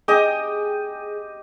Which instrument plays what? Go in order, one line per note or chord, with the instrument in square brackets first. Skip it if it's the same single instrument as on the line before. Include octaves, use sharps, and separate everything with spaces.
[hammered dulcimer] G4 D#5 [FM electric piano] G#4 G5